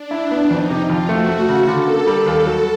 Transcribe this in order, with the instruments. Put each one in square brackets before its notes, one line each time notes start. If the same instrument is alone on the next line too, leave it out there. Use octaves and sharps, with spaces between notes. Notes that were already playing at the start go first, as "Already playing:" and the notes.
Already playing: [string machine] D4
[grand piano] E4
B3
[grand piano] F2 [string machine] D#4
[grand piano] C3
[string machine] F4
[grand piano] F2
[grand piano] A3 [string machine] F#4
[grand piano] A3
C#3
[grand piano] D3 [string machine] A4
[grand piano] A#3
G3
D#2
F#3